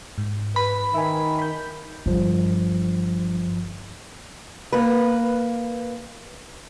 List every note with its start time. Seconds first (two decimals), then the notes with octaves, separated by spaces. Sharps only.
0.18 G#2
0.56 B4 B5
0.94 D#3 E5 G#5
1.39 B5 G6
2.06 G1 G2 F3
4.72 A#3 B4